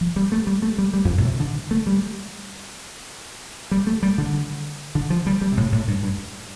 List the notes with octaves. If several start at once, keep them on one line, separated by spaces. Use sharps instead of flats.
F3
G3
A3
G3
A3
G3
G3
F2
G2
A2
C3
D3
A3
G3
G3
A3
G3
D3
D3
F3
G3
G3
C3
A2
A2
G2
G2